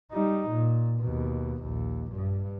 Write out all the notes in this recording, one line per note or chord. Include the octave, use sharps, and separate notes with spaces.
G3 D#4
A#2
D#2 B2
A#1 D#2
G2